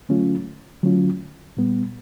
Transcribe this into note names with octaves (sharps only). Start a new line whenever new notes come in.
D3 F#3 A3 C#4 F4
D3 F#3 A3 C#4 F4
A#2 G3 B3